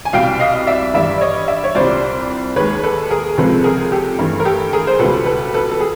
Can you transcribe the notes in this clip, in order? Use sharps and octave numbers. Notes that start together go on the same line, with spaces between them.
G#5
C2 B2 G3 F5 G5
D#5 F5
D5 E5
G2 E3 G3 D5 E5
D5
C#5 D#5
D5 E5
C#5
C2 A#2 G3 C5 D5
D#2 D#3 G#3 B4 C#5
A4 B4
G#4 A#4
C#2 C3 F3 G#3 A4 B4
G#4 A#4
G4 A4
G2 E3 A3
A#4
G4 A4
G#4 A#4
C5
C#2 B2 G3 A4 B4
A4 B4
A4 B4
A4
G#4